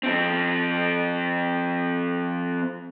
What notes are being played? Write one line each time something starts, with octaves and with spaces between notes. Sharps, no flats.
F3 C4